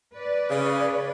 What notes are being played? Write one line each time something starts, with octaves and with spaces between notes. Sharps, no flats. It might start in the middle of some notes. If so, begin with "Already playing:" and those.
B4 D5
C#3